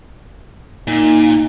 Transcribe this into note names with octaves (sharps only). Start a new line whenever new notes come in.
A#2 D#4